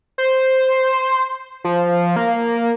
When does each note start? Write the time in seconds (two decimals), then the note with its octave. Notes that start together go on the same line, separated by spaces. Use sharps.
0.18 C5
1.64 F3
2.16 A#3